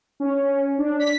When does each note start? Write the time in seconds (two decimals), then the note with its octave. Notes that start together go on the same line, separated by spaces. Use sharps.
0.20 C#4
0.78 D4
0.99 B6